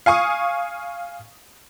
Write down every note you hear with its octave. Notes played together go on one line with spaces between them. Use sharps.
F5 G#5 C#6 D#6